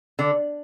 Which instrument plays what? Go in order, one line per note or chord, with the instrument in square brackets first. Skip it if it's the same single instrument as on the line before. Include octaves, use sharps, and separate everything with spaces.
[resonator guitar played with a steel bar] D3